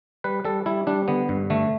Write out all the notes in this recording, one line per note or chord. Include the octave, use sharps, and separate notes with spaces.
G3 B4
G3 A4
G3 E4
G3 D4
D3 B3
G2
D3 A3